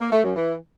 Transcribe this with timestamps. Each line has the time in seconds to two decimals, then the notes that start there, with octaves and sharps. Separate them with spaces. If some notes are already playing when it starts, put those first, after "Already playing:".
0.01 A#3
0.12 A3
0.24 F#2
0.35 E3